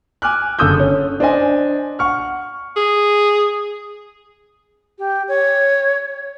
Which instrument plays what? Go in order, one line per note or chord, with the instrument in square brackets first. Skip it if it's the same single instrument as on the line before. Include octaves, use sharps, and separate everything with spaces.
[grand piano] G#5 D6 F6 F#6
F#1 D3 A4 D#6 E6 G6
C#4
D4 C5 D#5 G#5
F#5 C#6 F6
[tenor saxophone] G#4
[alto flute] G4
C#5